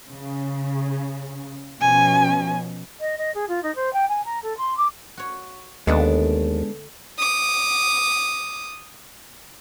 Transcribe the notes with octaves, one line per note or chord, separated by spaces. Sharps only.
C#3
B2 F3 C#4 G#5
D#5
D#5
G#4
F4
D#4
C5
G5
G#5
A#5
A4
C6
D6
F#4 C#5
D#2 D3 G#3 A3 B3 D4 B4
D6 D#6